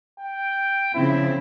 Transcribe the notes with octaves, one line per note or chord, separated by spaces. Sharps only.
G5
C#3 F3 C4 E4